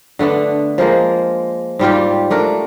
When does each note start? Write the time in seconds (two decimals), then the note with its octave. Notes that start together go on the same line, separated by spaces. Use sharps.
0.19 D3 A3 B3 D4
0.78 F3 G#3 A#3
1.79 G#2 G3 F4 G4
2.30 A3 D4 A#4